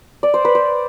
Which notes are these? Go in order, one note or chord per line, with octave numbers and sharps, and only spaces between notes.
D5
C5
B4
C5